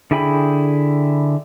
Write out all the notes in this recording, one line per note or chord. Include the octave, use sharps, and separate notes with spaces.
D3 E4 G#4 G5 B5